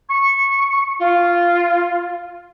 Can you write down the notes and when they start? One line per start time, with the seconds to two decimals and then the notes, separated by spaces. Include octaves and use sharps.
0.09 C#6
0.99 F4